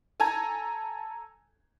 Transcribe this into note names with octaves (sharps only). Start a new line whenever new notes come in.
A4 G#5 A#5 G#6